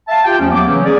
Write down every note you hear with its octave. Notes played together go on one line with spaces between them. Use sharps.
E5 F5 A5
F4 G4 G5
E2 F3 A3 C#4
F#3 A#3 B3 D6
C#3 E3 F#3 A3 C#4
B3 C#4 G#4 D5